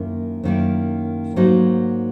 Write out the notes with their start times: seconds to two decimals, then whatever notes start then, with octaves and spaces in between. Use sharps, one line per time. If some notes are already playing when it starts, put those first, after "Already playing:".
Already playing: F#2 D#3 A#3 E4
0.43 F#2 D#3 A#3 E4
1.36 G#2 F#3 A#3 D#4